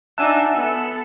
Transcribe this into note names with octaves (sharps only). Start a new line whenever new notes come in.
D4 D#4 E5 F#5 G#5 A5 E6
B3 A4